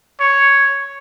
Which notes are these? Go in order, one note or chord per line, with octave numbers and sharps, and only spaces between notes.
C#5